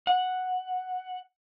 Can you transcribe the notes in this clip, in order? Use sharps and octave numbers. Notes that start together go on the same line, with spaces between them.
F#5